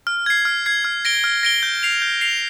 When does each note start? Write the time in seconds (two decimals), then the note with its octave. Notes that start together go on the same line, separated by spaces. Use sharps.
0.07 F6
0.26 G#6 C7
0.45 F6
0.66 G#6 C7
0.84 F6
1.05 A#6 D7 G7
1.24 F6
1.43 A#6 D7 G7
1.63 G6
1.83 C7 F7
2.02 G6
2.21 C7 F7